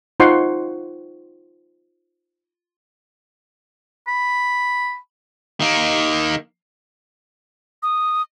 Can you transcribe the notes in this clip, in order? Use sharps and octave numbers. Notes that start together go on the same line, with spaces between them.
D#4 F4 C5 F#5 C6 C#6
B5
D#3 A#3
D#6